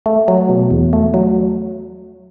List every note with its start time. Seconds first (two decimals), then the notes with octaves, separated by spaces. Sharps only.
0.06 A3
0.28 F#3
0.49 B2
0.70 E2
0.93 A3
1.14 F#3